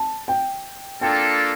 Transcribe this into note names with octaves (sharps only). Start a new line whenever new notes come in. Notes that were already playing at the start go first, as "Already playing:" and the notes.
Already playing: A5
G5
A#3 D4 F4 A4 G5